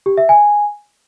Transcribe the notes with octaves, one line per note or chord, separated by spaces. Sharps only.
G4
E5
G#5